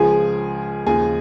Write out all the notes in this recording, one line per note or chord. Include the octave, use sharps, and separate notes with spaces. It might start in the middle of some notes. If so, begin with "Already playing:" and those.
Already playing: C#2 C#3 F3 G#4 G#5
D#2 C#3 F3 G#4 G#5